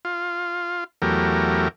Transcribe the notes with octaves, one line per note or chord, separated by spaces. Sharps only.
F4
E2 F#3 A3 G4 A#4